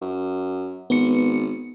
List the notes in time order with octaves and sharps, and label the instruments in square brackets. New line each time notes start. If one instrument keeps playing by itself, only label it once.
[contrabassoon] F#2
[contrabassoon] G#1 [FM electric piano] B3 C#7